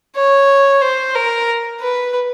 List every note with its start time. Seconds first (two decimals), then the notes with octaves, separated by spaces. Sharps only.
0.16 C#5
0.81 C5
1.15 A#4
1.81 B4